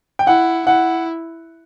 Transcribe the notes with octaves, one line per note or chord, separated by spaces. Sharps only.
G5
E4 F#5
E4 F#5